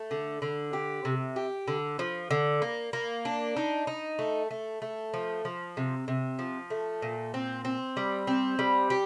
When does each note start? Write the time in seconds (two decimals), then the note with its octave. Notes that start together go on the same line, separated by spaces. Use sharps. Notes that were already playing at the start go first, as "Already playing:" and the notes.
Already playing: A3
0.11 D3
0.42 D3
0.73 G4
1.05 C3
1.36 G4
1.68 D3
1.99 F3
2.31 D3
2.62 A#3
2.93 A#3
3.25 D4
3.57 D#4
3.87 D#4
4.19 A3
4.51 A3
4.82 A3
5.14 F3
5.45 F3
5.77 C3
6.08 C3
6.39 F3
6.70 A3
7.02 A#2
7.34 C4
7.65 C4
7.97 G3
8.27 C4
8.59 G3
8.90 G4